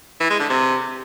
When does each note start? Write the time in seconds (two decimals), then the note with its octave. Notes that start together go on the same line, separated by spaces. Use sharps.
0.20 E3
0.30 G#3
0.40 D3
0.49 C3